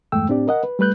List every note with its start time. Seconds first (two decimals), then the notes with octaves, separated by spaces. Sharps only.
0.12 E2 G2 G#3 A3 G5 E6
0.29 A2 C4 D4 G4 D5
0.47 A#4 D#5 F#5
0.64 B4
0.79 G3 A3 B4 F#6 G6